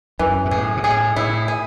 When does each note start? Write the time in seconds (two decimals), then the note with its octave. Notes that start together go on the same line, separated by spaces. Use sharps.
0.19 F#2 E3
0.45 G#2
0.51 A2 G#4
0.77 B2
0.84 A2 G#4
1.16 A2 E4
1.48 G#4